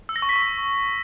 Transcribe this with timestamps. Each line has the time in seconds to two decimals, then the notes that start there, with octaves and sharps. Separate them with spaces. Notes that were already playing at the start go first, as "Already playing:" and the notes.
0.09 E6
0.16 A#6
0.22 C#6
0.29 B6
0.36 C#6